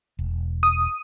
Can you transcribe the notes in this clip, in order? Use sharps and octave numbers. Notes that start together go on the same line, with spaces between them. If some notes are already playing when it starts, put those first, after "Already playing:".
E1
D#6